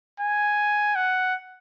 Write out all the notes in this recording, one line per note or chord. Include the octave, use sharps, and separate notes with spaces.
G#5
F#5